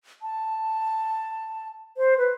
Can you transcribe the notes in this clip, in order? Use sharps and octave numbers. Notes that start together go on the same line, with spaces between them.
A5
C5
B4